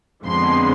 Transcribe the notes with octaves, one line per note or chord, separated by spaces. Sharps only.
F2 D3 F3 G#3 B3 C6